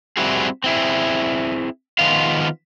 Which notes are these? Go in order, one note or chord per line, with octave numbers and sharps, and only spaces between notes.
G3 C4 E4 F#4 G#4
C4 E4 G#4
D#3 F3 G#3 B3 F4 F5